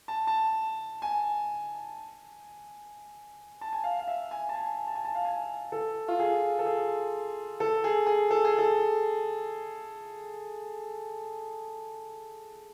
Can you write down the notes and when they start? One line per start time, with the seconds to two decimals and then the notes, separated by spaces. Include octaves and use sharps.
0.08 A5
0.27 A5
1.02 G#5
3.61 A5
3.73 G#5
3.84 F5
3.99 F5
4.08 E5
4.31 G#5
4.49 A5
4.55 G#5
4.87 A5
4.95 G#5
5.05 A5
5.15 F5
5.25 G#5
5.72 A4
6.08 F4
6.19 G#4
6.59 A4
6.66 G#4
7.60 A4
7.84 G#4
8.07 G#4
8.31 A4
8.45 G#4
8.58 A4